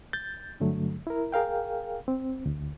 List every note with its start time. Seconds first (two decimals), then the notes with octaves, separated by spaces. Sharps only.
0.13 G6 A6
0.60 G2 D3 F#3 A3
1.07 E4 A#4
1.32 G#4 A#4 F5 G5
2.08 C4
2.46 D2